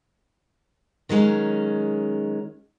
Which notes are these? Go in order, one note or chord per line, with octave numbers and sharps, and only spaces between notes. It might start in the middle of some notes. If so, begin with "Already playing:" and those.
D#3 F#3 G#3 C#4